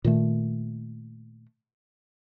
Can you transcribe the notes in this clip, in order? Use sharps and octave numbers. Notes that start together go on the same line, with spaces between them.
A#2 D#3 A3